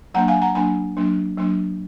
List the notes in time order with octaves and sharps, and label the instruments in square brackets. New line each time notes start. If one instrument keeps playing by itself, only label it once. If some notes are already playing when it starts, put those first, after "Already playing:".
[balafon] F#3 A#3 D4 F#5 A#5
F5 G#5
F#5 A#5
F#3 A#3 D4 G#5 B5
F#3 A#3 D4
F#3 A#3 D4